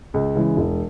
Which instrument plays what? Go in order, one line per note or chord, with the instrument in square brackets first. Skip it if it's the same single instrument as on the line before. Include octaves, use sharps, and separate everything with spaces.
[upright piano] C#2
C#3 E3 G#3
E1